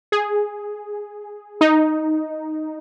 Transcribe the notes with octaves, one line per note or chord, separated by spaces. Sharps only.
G#4
D#4